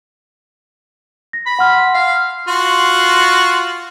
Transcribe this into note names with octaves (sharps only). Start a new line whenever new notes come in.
A#6
B5
F#5 C6 F6
F5
F4 F#4 C6